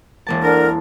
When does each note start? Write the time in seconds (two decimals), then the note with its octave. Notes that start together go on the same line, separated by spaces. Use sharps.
0.27 E1 A#3 A5
0.43 D3 D4 A#4